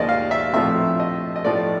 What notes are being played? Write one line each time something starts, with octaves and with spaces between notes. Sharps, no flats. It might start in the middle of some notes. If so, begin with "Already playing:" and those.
Already playing: D#2 C#3 F3 A#3 D5 D#5
F5
E5
A#1 A2 F3 A3 C4 E5
D#5
D#5
A2 F3 A3 D5